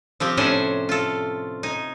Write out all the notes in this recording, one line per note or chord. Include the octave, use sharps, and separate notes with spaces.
F3 C4 G4
A2 C3 C#4 D4 C5 G#5
F4 A4
D#4 G#5